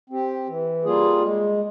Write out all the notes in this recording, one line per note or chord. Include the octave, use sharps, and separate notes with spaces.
C4 G4
E3
G3 A#3 F4 G#4
G#3